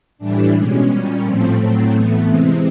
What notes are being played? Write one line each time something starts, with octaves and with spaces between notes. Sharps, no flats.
A2 E3 G3 D4
B2 G#3 C#4
A#2 G3 C#4
A2 F3 A3 C4
A2 F#3 A3
A2 E3 A3 B3
C3 E3 G#3 C4